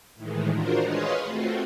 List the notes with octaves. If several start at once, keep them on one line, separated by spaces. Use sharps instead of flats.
A2 D#3 E3 G#3
D4 F4 F#4 A#4 C5
G#4 B4 C#5 D#5 F5 C6
A3 C4 F4 F#4